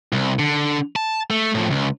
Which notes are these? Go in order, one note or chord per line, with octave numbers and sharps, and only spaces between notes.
C2
D3
A5
A3
A2 F3
C#2